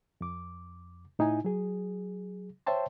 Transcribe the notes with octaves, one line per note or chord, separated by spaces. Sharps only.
F2 D6
A2 D#4 E4 G#5
F#3 G#4
C5 C#5 E5 G5 A5 C6